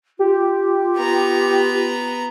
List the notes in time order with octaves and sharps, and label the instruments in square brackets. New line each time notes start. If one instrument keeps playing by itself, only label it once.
[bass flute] F4 [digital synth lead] G4
[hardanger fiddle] B3 A#5